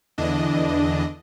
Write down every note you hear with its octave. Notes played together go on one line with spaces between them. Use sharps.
E2 D3 E3 D4 D#5